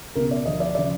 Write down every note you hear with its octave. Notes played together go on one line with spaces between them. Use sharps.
C#2 B2 A#4
D5
D2 D3 F3 D#5
D5
C#3 F3 D5